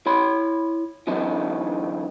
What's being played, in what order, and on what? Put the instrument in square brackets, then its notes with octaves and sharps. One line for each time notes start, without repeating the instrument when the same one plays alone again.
[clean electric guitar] E4 C#5 B5 C6
D3 E3 F#3 C4 D#4